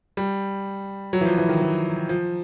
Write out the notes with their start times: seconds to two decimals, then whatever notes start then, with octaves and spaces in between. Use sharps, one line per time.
0.17 G3
1.13 F#3
1.21 E3
1.25 F3
1.38 E3
1.49 D#3
1.62 E3
2.09 F3